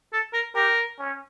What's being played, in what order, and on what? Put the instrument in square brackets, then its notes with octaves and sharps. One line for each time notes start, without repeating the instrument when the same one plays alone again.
[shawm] A4
A#4
[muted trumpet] G4 [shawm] A#4
[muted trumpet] C#4